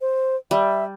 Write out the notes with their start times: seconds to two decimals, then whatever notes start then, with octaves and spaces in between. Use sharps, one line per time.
0.01 C5
0.51 G3 E5